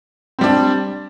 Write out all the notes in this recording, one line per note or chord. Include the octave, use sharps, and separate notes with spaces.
G3 C4 D4